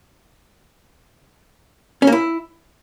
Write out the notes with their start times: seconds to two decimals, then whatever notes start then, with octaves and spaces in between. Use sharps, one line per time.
2.02 C#4
2.07 A#3
2.12 E4